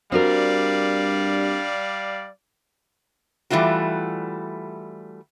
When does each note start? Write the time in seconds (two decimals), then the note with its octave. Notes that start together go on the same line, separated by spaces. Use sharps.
0.12 G2 G3 C4 F#4 A#4 D5 F5
3.50 E3 G3 A3 F4 F#4